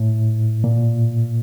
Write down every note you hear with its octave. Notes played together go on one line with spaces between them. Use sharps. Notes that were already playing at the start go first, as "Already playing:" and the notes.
Already playing: A2
A#2